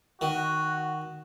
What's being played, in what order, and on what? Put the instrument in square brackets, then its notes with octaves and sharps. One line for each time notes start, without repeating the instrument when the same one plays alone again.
[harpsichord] D#3 [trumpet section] F#4